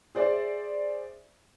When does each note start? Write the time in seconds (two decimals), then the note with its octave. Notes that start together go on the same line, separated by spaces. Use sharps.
0.15 G#4 C5 D5 E5